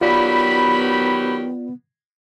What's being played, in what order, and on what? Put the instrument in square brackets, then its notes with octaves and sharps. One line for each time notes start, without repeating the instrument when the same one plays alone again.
[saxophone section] D#3 F#3 G4 [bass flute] B3 [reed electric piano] F4 D5 [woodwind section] B5